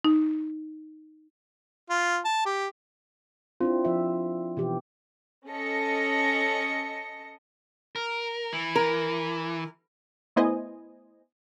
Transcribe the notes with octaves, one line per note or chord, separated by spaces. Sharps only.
D#4
F4
A5
G4
C4 D4 E4 F4
F3 E5
B2 E3 G4
C#4 A4 D#5 A#6 C#7
A#4
E3
A#4
A3 B3 E4 C5 D#5 G#5